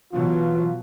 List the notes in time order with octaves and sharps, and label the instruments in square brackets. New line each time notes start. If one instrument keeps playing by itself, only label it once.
[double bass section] B2 F#3 [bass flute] E3 [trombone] F4